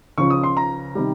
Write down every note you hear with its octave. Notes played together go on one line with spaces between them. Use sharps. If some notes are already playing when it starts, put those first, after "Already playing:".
C#2 C#3 F3 C#6
D#6
C6
A#5
C3 D#3 G3